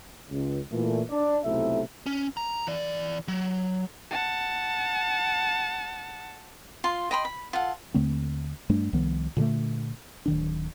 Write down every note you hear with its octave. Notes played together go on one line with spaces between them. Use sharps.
C#2
A#2 E3 A3
D4 D5
B1 C3 A3 E4 E5
C#4
A#5
E3 D5
F#3
F#5 A5
F4 C6
D#5 G5 B5 C6
B5
F4 A4 F#5
D#2 D3 A3 C4
G2 G3 A3 D4
C2 D#3 F3 B3
A#2 D3 G3 A3
D1 D#3 D4